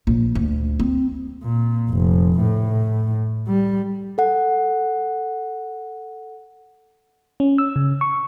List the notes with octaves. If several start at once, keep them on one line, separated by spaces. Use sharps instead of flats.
A#1
D2
C4
A#2
F1
A2
G3
A4 F#5
C#4
E6
C#3
C#6